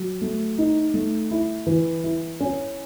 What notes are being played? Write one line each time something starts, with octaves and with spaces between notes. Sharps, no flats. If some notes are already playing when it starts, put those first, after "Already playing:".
Already playing: F#3
A3
D#4
A3
E4
E3
E4
C#4